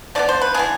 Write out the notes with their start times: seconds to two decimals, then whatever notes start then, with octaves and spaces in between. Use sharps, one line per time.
0.15 D3 G#3 B3 D5
0.29 C5
0.42 B4
0.54 E3 B3 D4 G#4